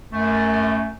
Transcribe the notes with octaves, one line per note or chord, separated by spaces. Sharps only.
F#2 A3